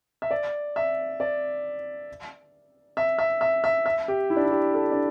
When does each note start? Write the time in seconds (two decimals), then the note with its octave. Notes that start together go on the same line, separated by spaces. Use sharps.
0.22 E5
0.31 D5
0.76 E5
1.20 D5
2.97 E5
3.19 E5
3.41 E5
3.64 E5
3.86 E5
4.08 G4
4.30 E4
4.36 D4
4.44 E4
4.51 G4
4.74 A4
4.92 D4